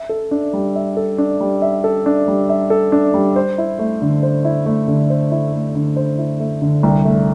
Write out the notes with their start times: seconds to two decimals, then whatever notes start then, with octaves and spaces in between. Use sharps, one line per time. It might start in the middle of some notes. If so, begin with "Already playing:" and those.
Already playing: E5
0.09 A4
0.31 D4
0.53 G3
0.76 E5
0.97 A4
1.18 D4
1.41 G3
1.62 E5
1.84 A4
2.06 D4
2.28 G3
2.49 E5
2.70 A4
2.92 D4
3.14 G3
3.36 C5
3.58 E4
3.79 A3
4.02 D3
4.23 C5
4.45 E4
4.66 A3
4.88 D3
5.10 C5
5.31 E4
5.53 A3
5.75 D3
5.97 C5
6.18 E4
6.40 A3
6.62 D3
6.83 C2
7.05 A3